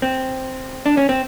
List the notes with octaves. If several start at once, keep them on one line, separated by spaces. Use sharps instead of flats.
C4
D4
C#4
C4